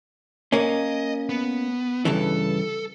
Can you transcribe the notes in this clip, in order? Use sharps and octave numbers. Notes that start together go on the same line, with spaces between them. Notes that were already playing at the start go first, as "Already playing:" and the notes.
A#3 C#4 D#5
B3
G2 C#3 E3 A4